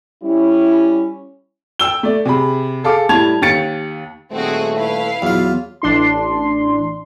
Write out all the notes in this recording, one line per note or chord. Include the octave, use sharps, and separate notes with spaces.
G3 C#4 E4
G5 E6 G7
A3 D5
C3 G#4 B5
G#4 A4 F5 D6
A2 G3 A5 G#6 F7
D#2 G4 A6 C#7
D#1 A3 C4 F#4 G#4
E4 B4 F5
E2 F#3 F4
A1 D4 C6